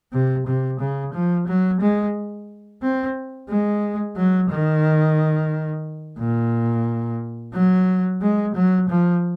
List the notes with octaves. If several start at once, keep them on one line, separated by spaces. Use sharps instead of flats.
C3
C3
C#3
F3
F#3
G#3
C4
G#3
F#3
D#3
A#2
F#3
G#3
F#3
F3